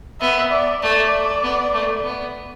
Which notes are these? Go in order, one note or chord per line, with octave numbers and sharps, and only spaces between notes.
B3 E5
D5
A3 D5
B3
A3
B3